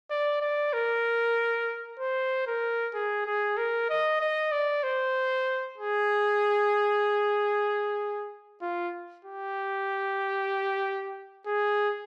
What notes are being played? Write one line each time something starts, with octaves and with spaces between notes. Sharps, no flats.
D5
D5
A#4
C5
A#4
G#4
G#4
A#4
D#5
D#5
D5
C5
G#4
F4
G4
G#4